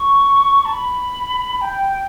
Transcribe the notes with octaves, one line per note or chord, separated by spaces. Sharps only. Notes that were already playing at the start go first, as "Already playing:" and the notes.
Already playing: C#6
A5
B5
G5